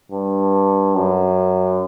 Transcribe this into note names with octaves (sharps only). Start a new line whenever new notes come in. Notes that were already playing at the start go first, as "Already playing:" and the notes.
G2
F#2